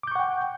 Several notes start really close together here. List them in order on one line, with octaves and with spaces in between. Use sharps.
D6 G6 C#6 F#5 G5